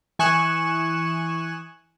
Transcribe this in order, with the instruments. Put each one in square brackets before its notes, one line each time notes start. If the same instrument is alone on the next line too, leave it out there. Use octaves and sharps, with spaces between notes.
[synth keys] E3 G#5 C#6 D#6 F#6 E7